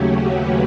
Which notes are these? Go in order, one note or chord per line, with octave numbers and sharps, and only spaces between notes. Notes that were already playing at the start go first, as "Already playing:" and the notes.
Already playing: D#2 C#3 F#3 A3 C#4 F#4 G4
B4